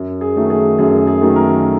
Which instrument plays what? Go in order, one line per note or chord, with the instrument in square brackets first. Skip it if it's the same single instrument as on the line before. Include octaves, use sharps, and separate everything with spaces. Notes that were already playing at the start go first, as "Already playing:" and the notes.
Already playing: [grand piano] F#2
G#4
D#3 F#3 A3
G#4
F#2 G#4
G#4
D#3 F#3 A3
A#4